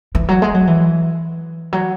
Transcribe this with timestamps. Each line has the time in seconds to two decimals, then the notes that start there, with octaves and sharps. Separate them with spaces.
0.15 E3
0.28 F#3
0.42 G#3
0.54 F#3
0.67 E3
1.73 F#3